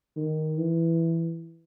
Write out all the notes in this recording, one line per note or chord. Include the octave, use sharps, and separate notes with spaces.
D#3
E3